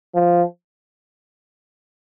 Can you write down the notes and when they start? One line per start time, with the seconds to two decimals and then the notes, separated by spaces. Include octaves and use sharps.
0.15 F3